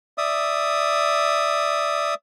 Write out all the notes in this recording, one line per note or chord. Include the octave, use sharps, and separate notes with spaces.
D5 E5 D#6